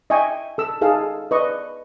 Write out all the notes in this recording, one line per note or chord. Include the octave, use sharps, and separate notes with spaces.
D#5 E5 G5 G#5 C#6
A4 E6
D#4 G#4 A4 F5
B4 D5 D#5 C#6